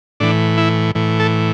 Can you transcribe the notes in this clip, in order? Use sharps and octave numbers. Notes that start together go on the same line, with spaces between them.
A2 E3 D4
E4
A2 E3
A4